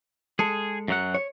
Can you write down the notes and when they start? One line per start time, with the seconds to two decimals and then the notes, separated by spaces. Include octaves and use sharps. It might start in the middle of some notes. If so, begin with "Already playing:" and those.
0.39 G#3 G#4 A4
0.88 F#2 F#3 F#5
1.14 C#5